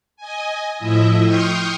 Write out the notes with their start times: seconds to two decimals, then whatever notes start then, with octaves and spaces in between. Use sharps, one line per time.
0.17 D#5 G#5
0.78 A2 F3 E4 D#5 E5
1.23 G5 C6 C#6 D#6 F6 G6